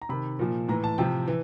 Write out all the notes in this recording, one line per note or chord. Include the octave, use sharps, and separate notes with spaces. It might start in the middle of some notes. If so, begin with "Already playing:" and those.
A#5
C3 D#3 B5
A#2 F3
A2 E3 A#5
A5
C3 F3 G5
E3